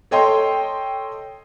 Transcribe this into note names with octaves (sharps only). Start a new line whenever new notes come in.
A4 C#5 D#5 G5 C6